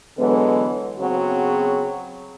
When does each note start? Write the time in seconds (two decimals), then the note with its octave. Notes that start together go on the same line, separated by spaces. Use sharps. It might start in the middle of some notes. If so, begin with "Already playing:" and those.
0.18 D3 E3 F#3 G#3 B3
0.99 C#3 F#3 B3 C4 F#4 G#4